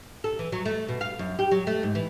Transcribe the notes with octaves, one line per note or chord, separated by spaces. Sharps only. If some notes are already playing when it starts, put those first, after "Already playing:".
A4
E3
F#3
A3
B2
F5
F#2
G4
F#3
A3
G#2
E3